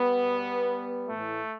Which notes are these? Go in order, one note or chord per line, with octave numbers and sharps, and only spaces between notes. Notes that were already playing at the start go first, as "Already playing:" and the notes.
Already playing: G3 B3
B2
A2 E3 A3